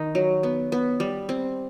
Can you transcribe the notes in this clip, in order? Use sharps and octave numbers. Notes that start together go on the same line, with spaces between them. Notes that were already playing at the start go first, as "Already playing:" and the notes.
Already playing: D#3 D#4
F#3
B3
B3
G3
C4